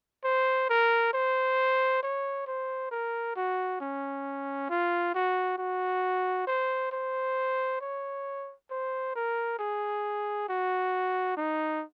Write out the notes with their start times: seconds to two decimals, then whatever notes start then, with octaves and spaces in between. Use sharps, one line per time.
0.24 C5
0.70 A#4
1.14 C5
2.03 C#5
2.47 C5
2.91 A#4
3.36 F#4
3.81 C#4
4.70 F4
5.15 F#4
5.58 F#4
6.47 C5
6.92 C5
7.81 C#5
8.71 C5
9.16 A#4
9.59 G#4
10.49 F#4
11.37 D#4